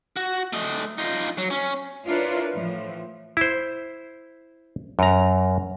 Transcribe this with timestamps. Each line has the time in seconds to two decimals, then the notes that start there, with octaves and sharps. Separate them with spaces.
0.16 F#4
0.53 A3 D#5
0.98 D#4 F4
1.38 F#3
1.50 C#4
2.06 D4 E4 F4 A#4 B4 C#5
2.54 A2 E3 F3
3.37 E4 C5
4.99 F#2 A#5